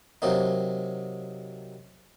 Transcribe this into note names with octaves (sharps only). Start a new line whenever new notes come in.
C3 F#3 A#3 D#4